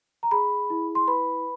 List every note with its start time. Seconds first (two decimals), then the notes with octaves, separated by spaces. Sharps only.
0.23 A#5
0.31 G#4 B5
0.70 E4
0.95 C6
1.07 B4 B5